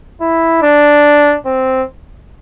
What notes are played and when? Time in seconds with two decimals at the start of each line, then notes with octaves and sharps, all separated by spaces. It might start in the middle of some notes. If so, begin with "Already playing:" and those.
0.21 E4
0.62 D4
1.46 C4